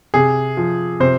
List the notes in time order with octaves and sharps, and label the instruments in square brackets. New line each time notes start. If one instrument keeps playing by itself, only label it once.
[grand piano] C3 G#4
F3
C3 C5